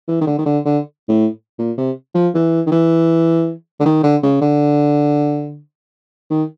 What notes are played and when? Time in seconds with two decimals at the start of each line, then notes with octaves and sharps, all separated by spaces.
0.08 E3
0.21 D#3
0.27 D3
0.38 D#3
0.46 D3
0.65 D3
1.09 A2
1.59 A#2
1.78 C3
2.15 F3
2.35 E3
2.67 D#3
2.72 E3
3.80 D3
3.86 D#3
4.03 D3
4.23 C#3
4.41 D3
6.30 D#3